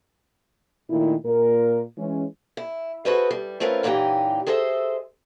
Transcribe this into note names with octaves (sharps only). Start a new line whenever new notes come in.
A#2 D#3 A3 E4
A#2 A#4
E3 G#3 C#4
E4
F#4 G#4 A4 B4 C5 D#5
G3
A3 C4 C#4 F4 A#4 B4
F#2 A#2 E3 D#4 G4 G5
G#4 A4 C5 D#5 E5